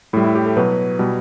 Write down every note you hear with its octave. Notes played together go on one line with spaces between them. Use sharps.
A2 G3 E4
E4
G4
A4
B2 F#3 B4
B2 G3